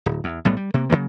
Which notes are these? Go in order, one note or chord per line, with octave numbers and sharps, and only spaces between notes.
D1
E2
B1 A2 G3 B3
G3
C3 A#3
C#3 E3 F#3 A#3